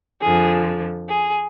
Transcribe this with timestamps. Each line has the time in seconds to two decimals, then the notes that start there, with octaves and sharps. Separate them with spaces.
0.21 F2 D3 F3 G#4
1.08 G#4